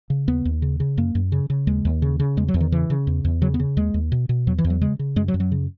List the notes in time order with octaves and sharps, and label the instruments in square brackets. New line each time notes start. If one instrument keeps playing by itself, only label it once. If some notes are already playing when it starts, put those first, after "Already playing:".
[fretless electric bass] C#3
D#2 B3
D#2
C#3
C#3
F#2 A#3
F#2
C#3
C#3
D#2 G#3
D#2
C#3
C#3
E2 G#3
F#3
E2
D#3
C#3 E3
C#3
E2
E2
C#3 F#3
B3
C#3
D#2 G#3
D#2
B2
B2
E2 F#3
E3
E2
F#3
C#3 G#3
C#3
F#2 G#3
F#3
F#2
F#3
C#3